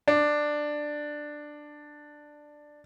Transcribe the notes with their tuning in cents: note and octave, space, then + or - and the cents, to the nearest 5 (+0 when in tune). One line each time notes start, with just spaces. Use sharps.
D4 +10